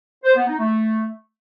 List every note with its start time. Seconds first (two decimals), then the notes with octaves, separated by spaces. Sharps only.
0.24 C5
0.36 B3
0.47 D#4
0.59 A3